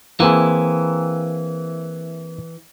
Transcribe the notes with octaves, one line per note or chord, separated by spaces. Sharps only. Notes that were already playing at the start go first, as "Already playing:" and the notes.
E3 A#3 C4 G#4